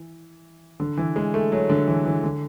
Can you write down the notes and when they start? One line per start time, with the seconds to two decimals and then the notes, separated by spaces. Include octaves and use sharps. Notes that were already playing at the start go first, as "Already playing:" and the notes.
Already playing: E3
0.80 D3
0.97 E3
1.16 G#3
1.34 A3
1.52 F#3
1.70 D3
1.88 E3
2.05 E3
2.24 D3